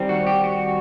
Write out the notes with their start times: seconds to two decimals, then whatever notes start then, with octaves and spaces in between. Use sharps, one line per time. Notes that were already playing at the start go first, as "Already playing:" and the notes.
Already playing: D#3 G3 C4
0.09 F#4
0.27 G4
0.44 F#4